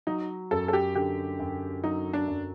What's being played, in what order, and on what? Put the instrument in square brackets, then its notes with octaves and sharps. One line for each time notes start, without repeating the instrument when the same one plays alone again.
[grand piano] F#3 [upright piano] D#4
[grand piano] F#2 [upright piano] A4
[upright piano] A4
G4
[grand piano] D3 [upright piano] G4
[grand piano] F#2
[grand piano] F#3 [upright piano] D#4
[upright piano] D4
[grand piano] F#2